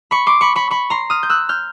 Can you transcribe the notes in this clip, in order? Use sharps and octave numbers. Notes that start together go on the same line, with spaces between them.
B5 C#6
C6 D6
B5 C#6
B5 C#6
B5 C#6
A#5 C6
D#6 F6
G6
E6 F#6
F6 G6